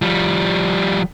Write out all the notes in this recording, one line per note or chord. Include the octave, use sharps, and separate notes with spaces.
F3 G3